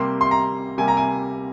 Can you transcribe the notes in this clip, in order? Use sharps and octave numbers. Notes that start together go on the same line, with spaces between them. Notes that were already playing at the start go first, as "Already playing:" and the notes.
Already playing: C3 G3 A#3 C6
C6
A#5
C3 G3 A#3 G#5
A#5
G#5